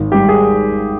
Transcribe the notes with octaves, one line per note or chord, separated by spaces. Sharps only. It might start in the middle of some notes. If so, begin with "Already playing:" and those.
Already playing: G#1
G#2 G3 G4
G#4